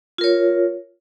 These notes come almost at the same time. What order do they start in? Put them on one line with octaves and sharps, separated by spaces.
F4 A#4 C#5